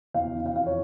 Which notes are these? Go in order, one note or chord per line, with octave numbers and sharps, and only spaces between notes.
E2 F5
E3
F5
F2 F5
C#5